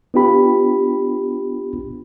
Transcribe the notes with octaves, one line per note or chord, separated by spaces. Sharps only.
B3 D4 F4 G4 B5